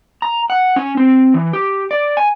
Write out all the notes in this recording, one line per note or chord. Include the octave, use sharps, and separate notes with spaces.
A#5
F#5
C#4
C4
E3
G4
D5
G#5